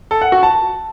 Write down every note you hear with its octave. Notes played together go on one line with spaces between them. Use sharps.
A4
F#5
F#4
A5